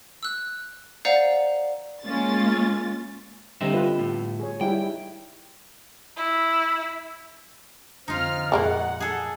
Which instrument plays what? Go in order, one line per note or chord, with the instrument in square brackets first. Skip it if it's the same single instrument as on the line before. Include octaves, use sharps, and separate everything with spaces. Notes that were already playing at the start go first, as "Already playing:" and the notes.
[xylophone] E6 F#6
C5 D5 F5 F#5 A#5
[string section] G#3 A#3 C#4 F4 A6
[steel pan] D3 G3 D#4 [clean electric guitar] C4 D#5 E5
[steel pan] B3 F4 B4
[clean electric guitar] A2
[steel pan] G#4 C#5
[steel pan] G3 D#4 E4 [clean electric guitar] G5
[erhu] E4
[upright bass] F2 D3 [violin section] C4 F6 [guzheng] D#4 F4
[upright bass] F2 A#2 [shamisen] F3 G#3 A#3 [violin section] F#5
[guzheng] G#4 A4